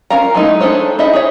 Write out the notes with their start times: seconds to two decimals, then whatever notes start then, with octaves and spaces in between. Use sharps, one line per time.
0.10 C#4 F4 A#4 F5 A#5
0.35 F#3 G#3 A3 D#4 E4
0.60 D4 G#4 A4 C5 C#5
0.99 D#4 E4 D#5 E5
1.13 G#4 C#5